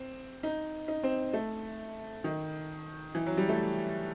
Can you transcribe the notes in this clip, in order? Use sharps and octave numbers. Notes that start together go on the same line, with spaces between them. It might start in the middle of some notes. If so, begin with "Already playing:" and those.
Already playing: C4
D#4
D#4
C4
A3
D#3
E3
F#3
G3
A3